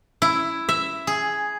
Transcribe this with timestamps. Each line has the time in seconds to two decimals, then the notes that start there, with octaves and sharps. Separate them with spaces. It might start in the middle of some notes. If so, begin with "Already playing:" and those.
0.22 E4
0.69 E5
1.07 G#4